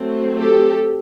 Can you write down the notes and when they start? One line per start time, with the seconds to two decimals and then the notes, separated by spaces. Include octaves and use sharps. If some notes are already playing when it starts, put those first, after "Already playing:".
Already playing: F#3 A3 C4
0.39 G4 A4